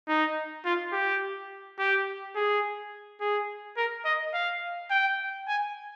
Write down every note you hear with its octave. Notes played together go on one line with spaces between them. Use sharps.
D#4
F4
G4
G4
G#4
G#4
A#4
D#5
F5
G5
G#5